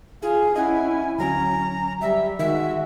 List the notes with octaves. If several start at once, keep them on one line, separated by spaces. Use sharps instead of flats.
F4 G#4 G#5
C#4 E4 D#5 F#5 G#5
D2 F#3 C#4 G#5 A#5
G3 E5
D#3 G#3 F#4 E5